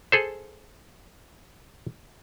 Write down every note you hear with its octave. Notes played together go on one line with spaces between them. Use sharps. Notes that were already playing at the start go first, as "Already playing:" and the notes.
G#4 A4 C5